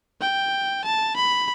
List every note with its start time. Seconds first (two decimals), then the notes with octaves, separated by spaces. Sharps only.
0.21 G5
0.84 A5
1.16 B5